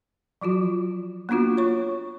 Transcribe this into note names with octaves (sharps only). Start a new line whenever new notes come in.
F3 F#3 F4 F#4
A#3 B3 D4 F4 F#4
C#5 C#6